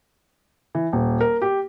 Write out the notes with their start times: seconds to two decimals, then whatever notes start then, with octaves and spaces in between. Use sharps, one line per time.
0.75 E3
0.93 D#1
1.21 A#4
1.42 G4